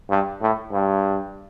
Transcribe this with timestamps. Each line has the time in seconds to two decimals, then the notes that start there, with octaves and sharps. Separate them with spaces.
0.10 G2
0.42 A2
0.72 G2